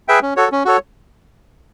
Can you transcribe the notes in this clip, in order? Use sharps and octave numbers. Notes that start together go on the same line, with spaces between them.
G#4 B4 E5 G5
C#4
F#4 A4 C#5
C#4
F#4 A4 C#5